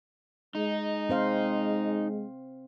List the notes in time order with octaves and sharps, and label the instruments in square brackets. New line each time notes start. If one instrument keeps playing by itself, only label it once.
[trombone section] G#3 [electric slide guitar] D#4
[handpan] C4 C5 F5